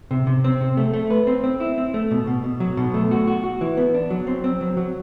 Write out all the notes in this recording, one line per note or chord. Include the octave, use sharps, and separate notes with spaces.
C3
C3
C4
C3
A3
A3
B4
C4
C4
E4
C4
A3
B2
B2
B2
F#3
B2
A3
F#4
F#4
F#4
E3
B3
D4
F#3
C4
C4
F#3
F#3